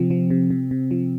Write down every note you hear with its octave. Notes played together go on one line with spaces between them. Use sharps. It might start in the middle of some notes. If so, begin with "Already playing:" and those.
Already playing: C3 F3 C4
F3
C3
C3
C3
F3